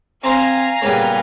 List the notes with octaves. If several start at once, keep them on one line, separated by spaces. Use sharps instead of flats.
C4 C5 F5 G#5 A#5
A#2 C#3 G3 B3 G#4